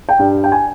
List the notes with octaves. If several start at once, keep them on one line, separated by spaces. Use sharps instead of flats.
G5
G2
G5
G#5